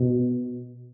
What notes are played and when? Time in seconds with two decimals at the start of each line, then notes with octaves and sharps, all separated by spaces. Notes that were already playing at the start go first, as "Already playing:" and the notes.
Already playing: B2